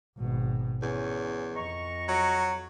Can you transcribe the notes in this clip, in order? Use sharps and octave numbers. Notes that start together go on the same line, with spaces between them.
G#1 B2
E2 C#4
F2 D#5 A#5 C#6
F#3